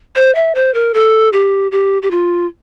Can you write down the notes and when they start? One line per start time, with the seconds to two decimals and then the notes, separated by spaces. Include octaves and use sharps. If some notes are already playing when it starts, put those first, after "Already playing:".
0.16 C5
0.35 E5
0.55 C5
0.74 A#4
0.94 A4
1.33 G4
1.72 G4
2.02 G4
2.11 F4